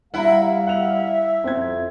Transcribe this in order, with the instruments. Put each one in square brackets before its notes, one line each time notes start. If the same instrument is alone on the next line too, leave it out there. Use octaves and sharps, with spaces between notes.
[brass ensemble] G3 F5 [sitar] E4 [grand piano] F#5 A#5
[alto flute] E5 [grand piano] F#5 F7
[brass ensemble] F2 [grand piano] C4 G#6